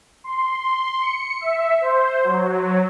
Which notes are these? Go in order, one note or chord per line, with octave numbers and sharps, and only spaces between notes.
C6
C#7
E5
C5
F#3